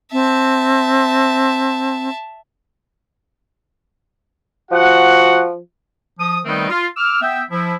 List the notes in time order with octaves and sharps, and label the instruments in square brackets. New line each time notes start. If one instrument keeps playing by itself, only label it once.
[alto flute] C4 [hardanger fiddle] E5 A5
[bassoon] F3 [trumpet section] F#4 F#5
[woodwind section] F3 D#6
D#3 G3 A3 B3 C4 D#4
F4
D6 E6 F6
B3 E5 G5
F3 E4